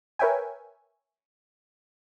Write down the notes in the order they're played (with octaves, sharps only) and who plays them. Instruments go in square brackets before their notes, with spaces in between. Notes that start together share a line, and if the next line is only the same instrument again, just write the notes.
[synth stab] A#4 B4 C#5 E5 G5 G#5